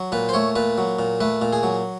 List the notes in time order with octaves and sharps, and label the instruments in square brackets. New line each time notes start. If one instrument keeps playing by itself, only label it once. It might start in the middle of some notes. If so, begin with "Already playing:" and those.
Already playing: [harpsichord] F#3
A#2 B4
C5
A3 C#5
A#2 B4
F#3
A#2
A3 B4
A#2
G#4
F#3